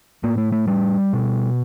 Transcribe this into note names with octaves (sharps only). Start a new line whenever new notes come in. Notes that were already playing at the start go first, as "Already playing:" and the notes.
A2 A#3
A3
A3
G3
B2